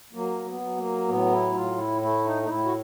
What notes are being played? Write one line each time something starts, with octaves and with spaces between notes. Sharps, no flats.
F#3 A#3
B3
F#3
A#3
A2 B3
E4
A2 F4
E4
A3 E4
D#4
D#4
A2 E4
F#4